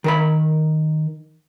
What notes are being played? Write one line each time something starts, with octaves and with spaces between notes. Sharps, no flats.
D#3 A#4 B5